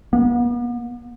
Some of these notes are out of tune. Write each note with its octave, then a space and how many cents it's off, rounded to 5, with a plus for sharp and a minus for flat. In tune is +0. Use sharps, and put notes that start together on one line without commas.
B3 -45